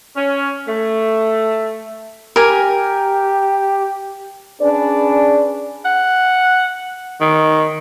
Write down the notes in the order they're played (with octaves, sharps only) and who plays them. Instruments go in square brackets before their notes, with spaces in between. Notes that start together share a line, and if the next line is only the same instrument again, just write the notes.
[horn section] C#4
A3
[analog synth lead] G4 [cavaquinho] A#4 G#5
[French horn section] C#4 D4 G#4 B4 D5
[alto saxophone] F#5
D#3